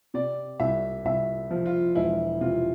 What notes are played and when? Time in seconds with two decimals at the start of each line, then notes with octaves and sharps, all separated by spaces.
0.14 C3 D5
0.60 C2 E5
1.05 C2 E5
1.50 F3
1.66 F4
1.95 E1 E4
2.41 C3 F4